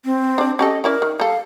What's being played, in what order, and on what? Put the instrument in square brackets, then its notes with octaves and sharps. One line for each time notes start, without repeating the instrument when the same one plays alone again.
[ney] C4
[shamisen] D4 D5
[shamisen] C#4 G4 A4 [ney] D#5
[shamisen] C#4 E4 D5 [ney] A#4
[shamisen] D#3
[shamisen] G3 A4 [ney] F5